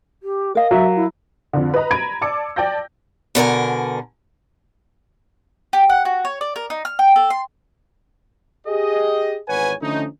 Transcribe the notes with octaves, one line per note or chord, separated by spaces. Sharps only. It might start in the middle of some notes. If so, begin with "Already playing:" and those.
G4
A#4 D#5 F5
F#3 E5
E4
F2 D3
B4 D#5 A#5
A#5 B5 G#6 D7 D#7
D5 A5 D6 E6 C#7
D5 G5 A5 G6 A#6
B2 D3 A#4 G#5
G4
F#5
F#4
C#5
D5
A#4
D#4
F6
G5
A4
C6
G4 G#4 D#5
G#1 E2 B4 C#5 F#5 G#5
D3 F3 A3 C#4 D#4